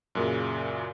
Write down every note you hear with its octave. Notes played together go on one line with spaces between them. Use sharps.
F#2 A#2 C#3